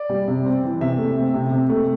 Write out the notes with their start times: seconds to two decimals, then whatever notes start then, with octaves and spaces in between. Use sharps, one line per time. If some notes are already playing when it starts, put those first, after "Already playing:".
Already playing: D5
0.09 G3
0.28 C3
0.45 C4
0.64 E3
0.81 C3 E5
0.98 A3
1.17 C4
1.34 C3
1.52 C3
1.70 A3